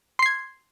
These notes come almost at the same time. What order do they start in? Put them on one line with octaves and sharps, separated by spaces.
C6 C7 G#6